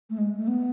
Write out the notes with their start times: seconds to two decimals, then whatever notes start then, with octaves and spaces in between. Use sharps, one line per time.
0.10 A3
0.18 G#3
0.37 A3
0.48 B3